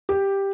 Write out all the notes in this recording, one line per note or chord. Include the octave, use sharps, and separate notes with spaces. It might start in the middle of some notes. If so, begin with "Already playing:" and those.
G4